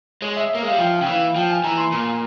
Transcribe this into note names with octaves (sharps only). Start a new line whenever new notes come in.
G#3 C#5
E5
E5
A#3
G#3 F5
G3
F3 G5
C#3 G5
E3 F5
F3 G5
G#5
E3 A#5
C6
A#2